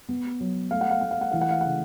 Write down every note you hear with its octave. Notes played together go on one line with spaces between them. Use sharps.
B3
F#3
A3 F5
F#5
F5
A3 F#5
F5
F#5
E3 F5
F#5
F5
C#3 F#5